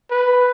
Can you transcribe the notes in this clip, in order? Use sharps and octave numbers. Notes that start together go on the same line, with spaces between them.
B4